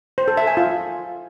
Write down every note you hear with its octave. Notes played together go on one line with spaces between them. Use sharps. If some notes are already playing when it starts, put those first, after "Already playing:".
C5
A4
E5
G#5
F4